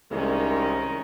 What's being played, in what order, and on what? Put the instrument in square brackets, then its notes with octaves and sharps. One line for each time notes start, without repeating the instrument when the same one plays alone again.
[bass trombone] C2 [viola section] D#3 G#3 C#4